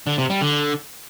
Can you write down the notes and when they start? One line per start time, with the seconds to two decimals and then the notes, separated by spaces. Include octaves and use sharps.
0.07 D3
0.18 C3
0.30 G3
0.41 D3